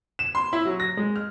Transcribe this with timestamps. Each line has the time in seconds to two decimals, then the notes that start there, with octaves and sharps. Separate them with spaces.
0.19 E7
0.35 C6
0.53 E4
0.65 F#3
0.80 A#6
0.97 G#3
1.16 F6